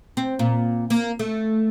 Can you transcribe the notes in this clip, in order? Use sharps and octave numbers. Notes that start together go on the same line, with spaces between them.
C4
A#2
A#3
A3